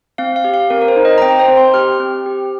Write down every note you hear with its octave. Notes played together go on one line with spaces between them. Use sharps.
C4 F5
F5
G4
F5
C4 A#4
A#4
C5
D#4
D#5
A#5
C4 G5
C5
C4
C6
G4 F6
C4
G4